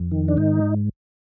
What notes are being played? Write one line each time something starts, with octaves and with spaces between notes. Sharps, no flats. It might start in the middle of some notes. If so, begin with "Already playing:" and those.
Already playing: F2
D#3
D4
G#2 D#4